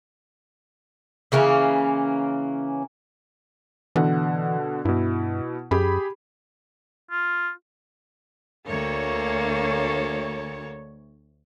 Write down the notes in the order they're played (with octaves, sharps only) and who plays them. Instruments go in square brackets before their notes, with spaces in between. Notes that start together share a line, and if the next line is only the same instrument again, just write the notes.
[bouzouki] C#3 E3 A#3 C#4
[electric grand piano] B2 D3 F#5 [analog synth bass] E3
[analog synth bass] G2 [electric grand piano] B2 E4
[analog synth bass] F#2 [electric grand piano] G4 G#4 B5
[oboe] F4
[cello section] D2 C#5 [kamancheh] A#3 A4